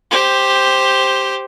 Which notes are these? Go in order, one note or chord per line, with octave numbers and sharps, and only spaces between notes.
G4 C5